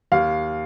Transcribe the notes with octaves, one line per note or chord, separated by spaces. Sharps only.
D#2 F5